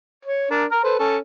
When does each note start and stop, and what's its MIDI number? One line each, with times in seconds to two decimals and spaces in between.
0.25 0.48 73
0.50 0.65 62
0.50 0.65 70
0.71 0.79 82
0.71 0.79 89
0.83 0.94 69
0.83 0.94 71
0.83 0.94 72
0.99 1.17 61
0.99 1.17 69